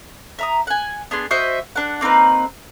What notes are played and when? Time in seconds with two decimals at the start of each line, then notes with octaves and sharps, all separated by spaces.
0.39 E5 A#5 D#6
0.67 F#5 G#5
1.11 B3 D4 G#4 C6
1.31 F#4 C5 D#5 E5
1.76 D4 F#5
2.01 A#3 C4 D#4 B4